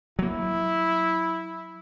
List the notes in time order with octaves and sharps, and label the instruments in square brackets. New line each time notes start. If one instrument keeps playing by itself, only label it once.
[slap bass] F#3 A#3 [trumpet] E4